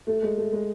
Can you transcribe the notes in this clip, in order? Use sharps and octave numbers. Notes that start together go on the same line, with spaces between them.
A3
G#3
A3
G#3